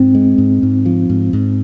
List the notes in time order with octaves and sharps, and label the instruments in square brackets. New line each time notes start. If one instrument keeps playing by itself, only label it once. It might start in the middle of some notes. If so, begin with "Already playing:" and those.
Already playing: [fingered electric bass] G#2 [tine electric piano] C4
[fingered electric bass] G#3
G#2
G#2
F3
G#2
G#2